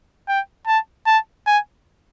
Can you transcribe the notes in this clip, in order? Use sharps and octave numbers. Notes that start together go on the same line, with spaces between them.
G5
A5
A5
G#5